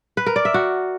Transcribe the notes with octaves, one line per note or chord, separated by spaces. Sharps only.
B4
A#4
D5
E5
F#4